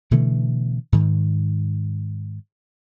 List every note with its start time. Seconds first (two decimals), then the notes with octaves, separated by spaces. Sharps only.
0.11 B2 D3 E3 A3
0.92 G#2 D#3